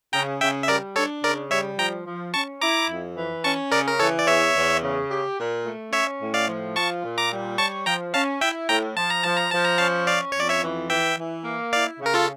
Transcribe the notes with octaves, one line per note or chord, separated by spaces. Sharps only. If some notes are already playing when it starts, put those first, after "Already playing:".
C#3 G5 A#5
C#3 E5 G5
E5
G3 A#4 D5
D4 A4 C#5
C#3 A#4 D5
G3 C#5 E5
F3 G5 A#5
F3
C#4 A5 C#6
E4 A#5 D6
F2
E3
C#4 A5 C#6
C#3 A#4 D5
A#4
E3 A4 C#5
D5
E2 C#5 E5
E2
C#3
G4
A#2
A3
C#4 C#5 E5
A2
D5 F5
F3
F4 A5 C#6
A#2
A#5 D6
G3
C#5 A5 C#6
F3 G5 A#5
C#4 F5 A5
E4 E5 G5
A2 G5 A#5
F3 A5
A#5
F3 A5
A#5
F3 A5
A#5
C#4 F5 A5
C#4 D5 F5
C#5
F2 D5
C#5 E5
E3
E3 E5 G5
E3
A#3
E4 D5 F5
C#3
A#4
F4 A4